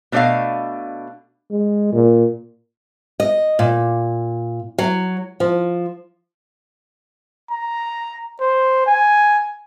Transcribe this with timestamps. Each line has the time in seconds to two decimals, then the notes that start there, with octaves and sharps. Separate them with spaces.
0.12 B2 A3 D4 C#5 D#5 F5
1.51 G#3
1.93 A#2
3.20 D#5
3.59 A#2
4.78 F#3
5.40 F3
7.51 A#5
8.41 C5
8.87 G#5